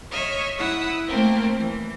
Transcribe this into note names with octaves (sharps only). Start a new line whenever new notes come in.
C#5 D#5 E5 F6
E4 F#5 D#6 E6
A3 A#3 C4 A#4
E3